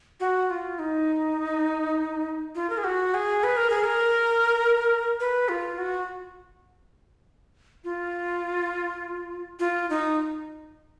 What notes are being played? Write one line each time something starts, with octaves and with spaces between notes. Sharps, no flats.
F#4
F4
D#4
F4
A#4
G#4
F#4
G#4
B4
A#4
G#4
A#4
B4
F4
F#4
F4
F4
D#4